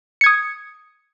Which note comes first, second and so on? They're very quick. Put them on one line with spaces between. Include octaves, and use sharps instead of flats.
C#7 G#6 D#6